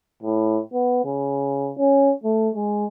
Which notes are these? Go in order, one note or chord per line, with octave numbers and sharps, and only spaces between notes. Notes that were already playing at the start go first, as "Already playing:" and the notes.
A2
B3
C#3
C#4
A3
G#3